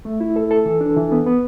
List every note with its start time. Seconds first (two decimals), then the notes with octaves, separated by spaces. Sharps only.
0.05 A3
0.20 E4
0.36 A4
0.51 A4
0.65 E3
0.81 D4
0.96 E3
1.12 B3
1.26 B3